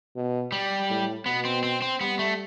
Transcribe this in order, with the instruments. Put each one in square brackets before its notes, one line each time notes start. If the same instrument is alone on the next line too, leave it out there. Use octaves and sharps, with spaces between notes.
[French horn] B2
[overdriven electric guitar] G3
[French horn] A2
[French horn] B2 [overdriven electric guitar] B3
[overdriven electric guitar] C4
C4
C4
[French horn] G3 [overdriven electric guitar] B3
[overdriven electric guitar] A3